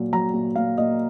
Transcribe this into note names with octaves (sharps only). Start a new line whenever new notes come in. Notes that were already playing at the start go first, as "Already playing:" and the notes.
Already playing: A#2 F#3
F#3 A#5
A#2
A#2 F5
A#2 D#5